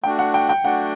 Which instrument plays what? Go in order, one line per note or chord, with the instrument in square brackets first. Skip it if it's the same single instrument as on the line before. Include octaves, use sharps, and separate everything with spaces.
[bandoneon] A3 D4 F#4 [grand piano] G5
[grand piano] F#5
G5
G5
[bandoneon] A3 D4 F#4 [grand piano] F#5